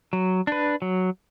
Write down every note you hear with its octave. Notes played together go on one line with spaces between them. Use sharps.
F#3
D4 B4
F#3